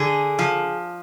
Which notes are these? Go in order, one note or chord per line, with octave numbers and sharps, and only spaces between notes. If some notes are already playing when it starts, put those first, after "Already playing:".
Already playing: D3 G#4
F3